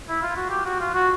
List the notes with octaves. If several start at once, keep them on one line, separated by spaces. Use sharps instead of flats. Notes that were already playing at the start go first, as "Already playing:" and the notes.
E4
F4
F#4
G4
F#4
F4
F#4